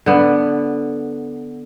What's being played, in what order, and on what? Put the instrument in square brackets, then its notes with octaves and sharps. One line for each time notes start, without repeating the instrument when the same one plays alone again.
[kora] D3 B3